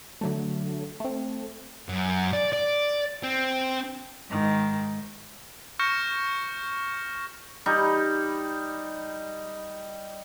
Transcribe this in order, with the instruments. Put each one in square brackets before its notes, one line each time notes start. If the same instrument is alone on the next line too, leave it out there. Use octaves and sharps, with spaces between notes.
[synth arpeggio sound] D3 F#3 A3
A3 C4
[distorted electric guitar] F#2
D5
D5
C4
[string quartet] G#2 D#3
[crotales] C#6 F6 G6 A#6 C#7 E7
[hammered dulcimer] G3 D#4